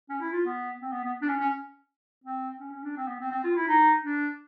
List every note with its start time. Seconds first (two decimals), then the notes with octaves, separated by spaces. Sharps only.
0.09 C#4
0.21 E4
0.33 F4
0.46 B3
0.81 C4
0.92 B3
1.04 B3
1.22 D4
1.28 C#4
1.40 C#4
2.24 C4
2.60 C#4
2.71 C#4
2.84 D4
2.96 C4
3.08 B3
3.20 C4
3.31 C4
3.44 F4
3.56 E4
3.68 D#4
4.03 D4